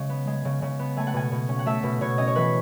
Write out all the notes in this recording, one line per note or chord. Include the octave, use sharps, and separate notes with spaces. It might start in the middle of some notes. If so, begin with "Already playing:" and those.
Already playing: C#3 G#3
B3
G#3
C#3
C#3
B3
A3 G#5
F#5
B2 G#5
B2
C#4
F#5
A3 E5
B2
B2 C#5
C#4 D#5
C#5
E3 B4